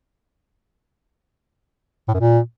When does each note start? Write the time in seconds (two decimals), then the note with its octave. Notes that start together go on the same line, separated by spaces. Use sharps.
2.08 A2
2.14 F#2
2.20 A#2